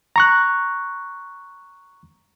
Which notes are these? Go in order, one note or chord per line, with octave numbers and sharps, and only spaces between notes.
A#5 C#6 F#6